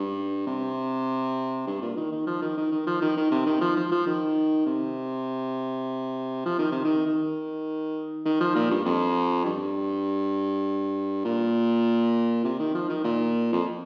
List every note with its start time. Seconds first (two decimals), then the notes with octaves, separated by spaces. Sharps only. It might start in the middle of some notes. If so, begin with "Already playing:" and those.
Already playing: G2
0.47 C3
1.67 G2
1.82 A#2
1.97 D#3
2.12 D#3
2.26 F3
2.42 D#3
2.57 D#3
2.72 D#3
2.86 F3
3.01 D#3
3.17 D#3
3.32 C3
3.46 D#3
3.61 F3
3.77 F3
3.91 F3
4.07 D#3
4.66 C3
6.46 F3
6.59 D#3
6.72 C3
6.84 D#3
7.06 D#3
8.25 D#3
8.40 F3
8.55 A#2
8.71 G2
8.85 F2
9.45 G2
11.25 A#2
12.44 C3
12.60 D#3
12.75 F3
12.89 D#3
13.04 A#2
13.53 F2